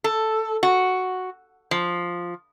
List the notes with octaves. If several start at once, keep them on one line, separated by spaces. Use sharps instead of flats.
A4
F#4
F3